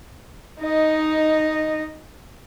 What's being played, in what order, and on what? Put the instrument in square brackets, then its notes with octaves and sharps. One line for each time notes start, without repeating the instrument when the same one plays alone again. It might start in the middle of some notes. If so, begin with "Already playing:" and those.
[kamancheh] D#4 D#5